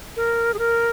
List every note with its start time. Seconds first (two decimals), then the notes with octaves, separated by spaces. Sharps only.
0.16 A#4
0.54 G#4
0.59 A#4